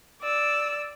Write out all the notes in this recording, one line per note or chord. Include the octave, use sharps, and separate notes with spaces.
D5 E6